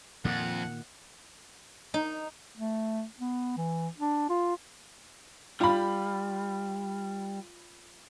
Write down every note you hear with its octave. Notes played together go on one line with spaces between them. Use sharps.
F2 A#2 D#3 A#3 F#5
D#4
A3
B3
E3
D4
F4
G3 F4 B5